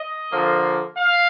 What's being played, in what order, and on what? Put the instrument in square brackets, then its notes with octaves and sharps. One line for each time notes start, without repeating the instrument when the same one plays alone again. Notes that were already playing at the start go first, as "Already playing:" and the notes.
Already playing: [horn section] D#5
D3 F3 A#3
F5